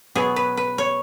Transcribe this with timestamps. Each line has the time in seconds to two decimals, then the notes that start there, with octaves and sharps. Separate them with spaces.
0.15 B2 F#3 B3 G#4
0.36 B4
0.57 B4
0.78 C#5